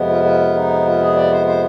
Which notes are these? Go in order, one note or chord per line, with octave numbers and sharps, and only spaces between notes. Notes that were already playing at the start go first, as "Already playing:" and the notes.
Already playing: F2 C3 F3 G#3 B3
F4
F4
D#4
F4
G#4
D5
C5
C5